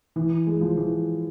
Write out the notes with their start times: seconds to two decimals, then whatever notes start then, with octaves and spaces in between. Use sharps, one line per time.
0.16 E3
0.47 G#3
0.61 F3
0.77 E3